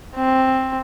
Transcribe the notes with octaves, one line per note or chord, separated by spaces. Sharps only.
C4